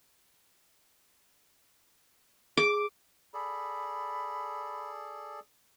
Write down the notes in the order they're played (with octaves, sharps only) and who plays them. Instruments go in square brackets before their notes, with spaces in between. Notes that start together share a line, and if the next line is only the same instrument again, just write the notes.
[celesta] G#4 [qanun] D6
[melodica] G#4 A4 D5 [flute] B5